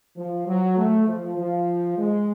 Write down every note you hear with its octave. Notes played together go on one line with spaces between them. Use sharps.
F3
F#3
A3
F3
F3
G#3